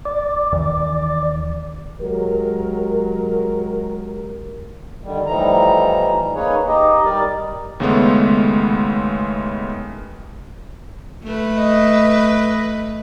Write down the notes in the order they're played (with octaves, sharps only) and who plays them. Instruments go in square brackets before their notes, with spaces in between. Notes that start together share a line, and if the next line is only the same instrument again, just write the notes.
[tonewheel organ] D5
[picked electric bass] D#2 D#3 E3
[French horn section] F#3 G#3 G4 A#4
[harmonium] D3 D#3 G3
A2 E3 F3 G3 D#4 A#5
A#3 C#4 D#4 G#4 B4 C#5
D#4 G4 D#5
G3 G4 A#4 D5
[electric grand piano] D#2 C#3 G#3 A3 B3
[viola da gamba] A3 B4
[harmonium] D#5